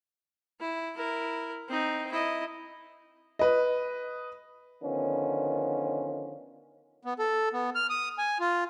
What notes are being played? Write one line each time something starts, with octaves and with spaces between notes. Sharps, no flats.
E4
E4 A#4
C4 D#4
E4 D#5
B4 D#5
D3 D#3 F3 B3 C#4
B3
A4
B3
F6
D#6
G#5
F4